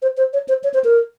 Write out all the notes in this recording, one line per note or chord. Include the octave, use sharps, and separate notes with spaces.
C5
C5
C#5
C5
C#5
C5
A#4